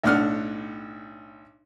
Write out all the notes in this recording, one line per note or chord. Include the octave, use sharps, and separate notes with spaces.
B1 A2 D4 F#5 F6